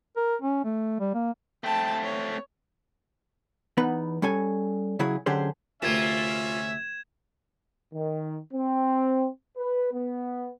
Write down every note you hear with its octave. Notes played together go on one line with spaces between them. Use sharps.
A#4
C#4
A3
G3
A#3
A3 C4 G5 A5
C#5
E2 B3 D#4 B4
G3 C#4 A4 G#5
C#3 F#3 E4 G#4
F#2 D3 C#4 G4 G#4 C5
D2 C3 A#3 C#4 F4 E5 G#6 E7
D#3
C4
B4
B3